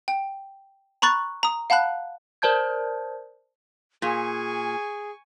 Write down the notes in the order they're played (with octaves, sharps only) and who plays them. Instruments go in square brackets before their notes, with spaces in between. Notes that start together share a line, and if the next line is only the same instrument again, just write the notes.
[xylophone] G5
A#5 B5 C#6 F#6 A6
A#5 D#6
F5 F#5 A5 B5 F#6
[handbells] A#4 C5 D5 A5 G6 G#6
[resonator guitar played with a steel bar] A#2 [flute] G#4 [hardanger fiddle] G#5 C#6